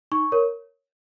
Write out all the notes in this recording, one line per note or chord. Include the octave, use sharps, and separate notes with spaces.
D#4 C#6
A#4 C#5